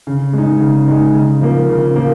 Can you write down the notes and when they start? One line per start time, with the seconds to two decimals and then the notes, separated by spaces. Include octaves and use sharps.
0.07 C#3
0.33 G#3 D#4
0.60 C#3
0.88 G#3 D#4
1.14 C#3
1.41 F3 A#3
1.69 C#3
1.96 F3 A#3